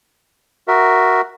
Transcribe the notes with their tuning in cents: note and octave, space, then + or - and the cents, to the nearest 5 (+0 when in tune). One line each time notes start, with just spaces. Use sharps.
F#4 +0 A#4 +0 E5 +0